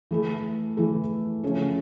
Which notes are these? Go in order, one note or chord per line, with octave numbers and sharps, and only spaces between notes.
E3 A3 E4 A4
E3 A3 E4 A4
C#3 F3 A3 C#4 F4